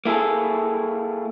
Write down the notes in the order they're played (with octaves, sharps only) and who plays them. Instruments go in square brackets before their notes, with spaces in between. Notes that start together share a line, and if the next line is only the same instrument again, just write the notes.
[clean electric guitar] A#3 E4 G#4 A4